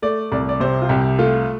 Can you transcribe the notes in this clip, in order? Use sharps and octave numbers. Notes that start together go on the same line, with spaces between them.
A3 D5
C2 D5
D5
C3 C5
F4
C2 G4
A3 F4